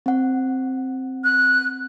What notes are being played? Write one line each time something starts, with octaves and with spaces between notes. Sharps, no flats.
C4 F#5
F#6